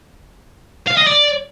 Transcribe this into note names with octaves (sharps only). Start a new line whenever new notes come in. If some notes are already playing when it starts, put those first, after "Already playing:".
F5
D#5
D5